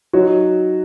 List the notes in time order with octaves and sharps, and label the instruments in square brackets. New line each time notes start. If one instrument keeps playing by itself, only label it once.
[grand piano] F#3 D#4 F#4 C#5